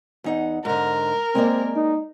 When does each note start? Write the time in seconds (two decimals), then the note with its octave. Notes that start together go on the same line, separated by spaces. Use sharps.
0.24 E2 D#4 F#5
0.65 G#2 D3 A#4
1.35 G#3 A#3 C4 D5
1.76 D#4